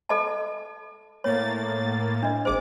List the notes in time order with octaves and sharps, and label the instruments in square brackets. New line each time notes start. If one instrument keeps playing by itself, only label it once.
[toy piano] A4 D#5 A5
[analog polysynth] A2 A#3 A6 [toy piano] C#5
[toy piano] D4 D#5
[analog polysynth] G#1 D6 [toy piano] G#4 C5